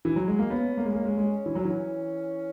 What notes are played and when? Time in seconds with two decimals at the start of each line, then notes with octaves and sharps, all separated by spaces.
0.05 E3
0.16 F#3
0.28 G#3
0.39 A#3
0.50 B3 C#4
0.77 A#3
0.85 G#3
0.93 A#3
1.05 G#3
1.17 G#3
1.46 E3
1.55 F#3 C#4
1.65 E3